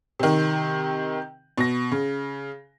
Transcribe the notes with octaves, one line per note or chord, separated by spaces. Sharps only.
C3 D#3
B2 A#6
C#3